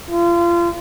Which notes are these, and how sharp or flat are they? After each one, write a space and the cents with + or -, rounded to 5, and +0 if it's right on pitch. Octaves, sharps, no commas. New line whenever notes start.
F4 -30